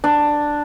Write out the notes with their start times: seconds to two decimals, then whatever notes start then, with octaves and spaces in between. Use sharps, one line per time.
0.04 D4